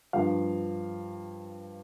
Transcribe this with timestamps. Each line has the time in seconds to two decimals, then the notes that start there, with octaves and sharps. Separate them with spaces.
0.13 G2 F3 F5